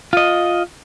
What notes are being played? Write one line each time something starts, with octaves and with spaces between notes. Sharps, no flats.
F4 D#5